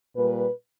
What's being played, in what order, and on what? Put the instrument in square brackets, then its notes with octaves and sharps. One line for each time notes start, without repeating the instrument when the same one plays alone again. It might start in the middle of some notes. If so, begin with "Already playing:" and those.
[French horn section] A#2 G3 B4